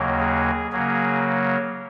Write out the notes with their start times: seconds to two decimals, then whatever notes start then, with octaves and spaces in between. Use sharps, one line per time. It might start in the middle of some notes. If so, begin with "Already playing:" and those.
Already playing: D#2 C#3 F#3 A#3
0.20 G#4
0.72 C#3 F#3 A#3 G#4